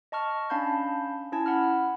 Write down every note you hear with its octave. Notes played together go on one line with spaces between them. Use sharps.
D#5 A5 C#6 F6
C#4 D4 F5 A5 B5 G6
C#4 E4 A5 G#6
F#5 B5 F6